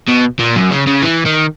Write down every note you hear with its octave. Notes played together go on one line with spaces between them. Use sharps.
B2
A#2
F#2
C#3
C#3
E3
D#3